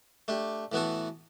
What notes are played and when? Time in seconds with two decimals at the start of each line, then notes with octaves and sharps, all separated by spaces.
0.28 A3 D4 G4
0.72 A2 E3 B3 F#4 A4